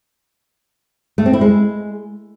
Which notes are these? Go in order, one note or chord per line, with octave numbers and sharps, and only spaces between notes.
A3
C4
E4
G#3